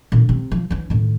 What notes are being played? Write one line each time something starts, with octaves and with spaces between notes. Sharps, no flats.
A#2 D3
C3
F3
E3 C#4
D#2 A2